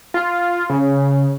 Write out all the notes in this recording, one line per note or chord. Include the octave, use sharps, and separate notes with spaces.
F4
C#3